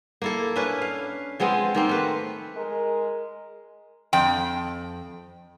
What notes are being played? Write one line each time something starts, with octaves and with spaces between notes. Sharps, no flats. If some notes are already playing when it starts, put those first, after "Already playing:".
A#3 E4 A4
C#4 D4 E4 B4
F5
F3 G#3 B3 C4
D#3 A#3 C4
A3 B4
G#3 A#4
F2 G5